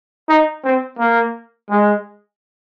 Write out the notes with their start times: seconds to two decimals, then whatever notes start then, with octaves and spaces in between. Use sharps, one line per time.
0.29 D#4
0.64 C4
0.99 A#3
1.70 G#3